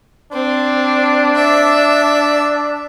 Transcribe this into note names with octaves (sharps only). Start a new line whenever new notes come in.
C4 D4
E5